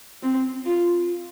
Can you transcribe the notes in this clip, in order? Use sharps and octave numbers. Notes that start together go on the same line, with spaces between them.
C4
F4